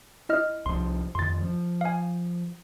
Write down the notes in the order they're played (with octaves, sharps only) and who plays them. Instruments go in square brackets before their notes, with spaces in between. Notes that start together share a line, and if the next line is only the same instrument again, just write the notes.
[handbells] E4 D#5 F6
[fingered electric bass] C2 F3 [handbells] C6
[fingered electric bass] F2 D#3 [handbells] C6 A6
[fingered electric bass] F3
[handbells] F5 G#5